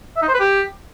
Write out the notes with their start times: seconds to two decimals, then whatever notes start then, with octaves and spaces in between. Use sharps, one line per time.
0.17 E5
0.22 D#4
0.28 C5
0.34 B4
0.40 G4